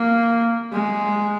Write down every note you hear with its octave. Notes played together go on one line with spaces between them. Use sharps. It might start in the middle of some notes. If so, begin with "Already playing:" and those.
Already playing: A#3
G#3